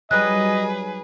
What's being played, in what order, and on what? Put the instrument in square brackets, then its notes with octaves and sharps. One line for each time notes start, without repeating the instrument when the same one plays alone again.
[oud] F#3 G3 D#4 [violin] G#4 B4 [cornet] D#5 [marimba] F#6